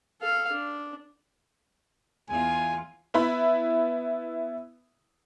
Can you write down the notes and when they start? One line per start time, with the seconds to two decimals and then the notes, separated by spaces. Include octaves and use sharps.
0.22 A4 F5
0.52 D4
2.29 E2 F4 G#5
3.14 B3 E4 E5 B5